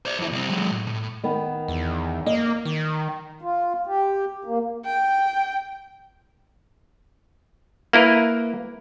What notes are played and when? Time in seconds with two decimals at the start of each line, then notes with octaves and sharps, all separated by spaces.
0.05 C5 D5
0.19 F2 E4
0.31 C2 C4
0.49 F#3 G#3
0.70 A2
0.87 A2
1.24 D#3 B3
1.68 E2
2.26 A#3 D#5
2.65 D#3
3.42 F4
3.86 G4
4.44 A#3
4.85 G5
7.93 A#3 E4 A#4 B4